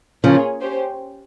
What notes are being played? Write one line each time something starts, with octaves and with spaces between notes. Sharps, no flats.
C#3 F3 A#3 C#4 F4 G#4 C#5
C#4 G4 C5